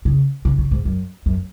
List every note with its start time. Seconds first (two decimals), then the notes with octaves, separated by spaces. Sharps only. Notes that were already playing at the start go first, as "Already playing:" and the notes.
0.05 C#3
0.45 C#3
0.59 C#3
0.71 G#2
0.85 F#2
1.26 F#2